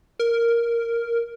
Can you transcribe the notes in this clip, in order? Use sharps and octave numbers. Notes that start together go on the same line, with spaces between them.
A#4